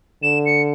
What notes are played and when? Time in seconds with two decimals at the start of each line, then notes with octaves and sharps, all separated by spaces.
0.23 D3 E7
0.46 C#7